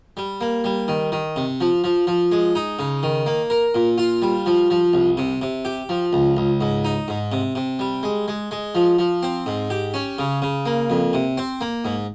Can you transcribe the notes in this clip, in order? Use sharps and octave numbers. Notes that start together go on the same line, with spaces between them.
G3
A#3
G3
D#3
D#3
C3
F3
F3
F3
G#3
D#4
C#3
D#3
A#3
A#4
A#2
F4
G3
F3
F3
C2
C3
C3
G4
F3
C#2
C#2
G#2
D#4
G#2
C3
C3
G3
G#3
G#3
G#3
F3
F3
C4
G#2
G4
C#4
C#3
C#3
A#3
F2
C3
C4
A#3
G#2